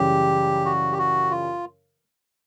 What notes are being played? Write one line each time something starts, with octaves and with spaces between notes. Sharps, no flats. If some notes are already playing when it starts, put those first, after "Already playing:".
Already playing: F#2 C#3 E3 G3 G4
F#4
G4
F#4
F4